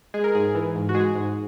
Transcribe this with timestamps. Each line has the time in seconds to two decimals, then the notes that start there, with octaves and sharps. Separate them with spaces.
0.14 G#3 G#4
0.24 A#4
0.35 G#2 G#4
0.55 E3
0.75 G#2
0.89 F#4
0.95 G#3 G#4
1.15 G#2